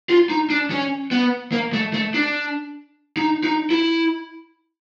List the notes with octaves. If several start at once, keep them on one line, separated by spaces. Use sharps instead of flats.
F4
D#4
D4
C#4
B3
A#3
A3
A3
D4
D#4
D#4
E4